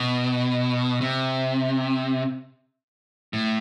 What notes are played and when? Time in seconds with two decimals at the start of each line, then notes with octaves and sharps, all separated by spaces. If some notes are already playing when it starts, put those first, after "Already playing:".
Already playing: B2
1.01 C3
3.33 A2